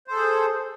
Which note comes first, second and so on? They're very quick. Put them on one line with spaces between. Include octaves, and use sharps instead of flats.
C5 A4 G#4